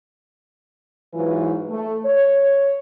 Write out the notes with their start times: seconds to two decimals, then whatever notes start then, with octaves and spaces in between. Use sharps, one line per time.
1.14 G#2 E3 F#3 E4 F4 B4
1.69 A3
2.05 C#5